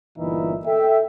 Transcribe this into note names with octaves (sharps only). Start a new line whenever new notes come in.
G1 A#2 E3 D#4 E4 E5
A4 E5 G5